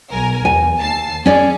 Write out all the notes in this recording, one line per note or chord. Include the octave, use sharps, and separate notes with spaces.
B1 A#4 G#5
E2 G#5
D#2 A5 C7
C#4 G#4 D5